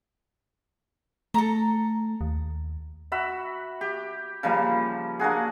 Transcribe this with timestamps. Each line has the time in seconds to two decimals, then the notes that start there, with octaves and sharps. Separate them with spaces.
1.34 A3 A4 A#5
2.21 D#2
3.12 F#4 E5 B5
3.81 G4
4.43 C#3 F3 G3 A#3
5.19 A#3 D4 F#4 G#4